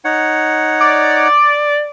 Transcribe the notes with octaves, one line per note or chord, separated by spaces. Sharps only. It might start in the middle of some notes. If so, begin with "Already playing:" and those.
D#4 C#5 F#5
D5